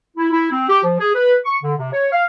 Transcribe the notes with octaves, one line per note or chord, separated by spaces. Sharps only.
E4
E4
C4
G4
F3
G#4
B4
C#6
D3
C3
C#5
F5